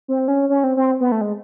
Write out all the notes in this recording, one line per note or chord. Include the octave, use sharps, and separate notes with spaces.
C4
C#4
C#4
C4
C4
B3
A3
G#3